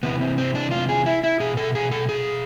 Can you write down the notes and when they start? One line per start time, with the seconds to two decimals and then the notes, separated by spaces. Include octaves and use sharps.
0.03 C3 E3 B3
0.21 C4
0.38 C4
0.55 D4
0.71 F4
0.89 G#4
1.06 E4
1.24 E4
1.40 B2 G#4
1.57 A4
1.75 G#4
1.91 A4
2.09 G#4